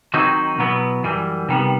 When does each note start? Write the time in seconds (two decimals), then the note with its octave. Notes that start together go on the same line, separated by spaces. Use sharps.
0.14 D#3 F#3 C4 D#4 F#4
0.58 B2 F#3 B3 E4
1.04 F#2 E3 G3
1.49 C3 D#3 G3 B3